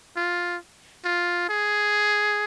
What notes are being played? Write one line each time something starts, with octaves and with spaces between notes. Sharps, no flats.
F4
F4
G#4